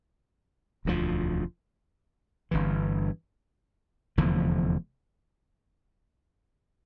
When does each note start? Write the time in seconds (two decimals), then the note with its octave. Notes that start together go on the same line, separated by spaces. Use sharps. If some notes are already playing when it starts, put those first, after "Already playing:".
0.85 E1 D2 D3 F3
2.51 G1 G2 E3
4.17 F1 E2 D3 F3